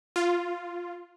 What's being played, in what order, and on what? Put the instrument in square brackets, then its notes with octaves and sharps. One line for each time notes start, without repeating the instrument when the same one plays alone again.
[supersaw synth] F4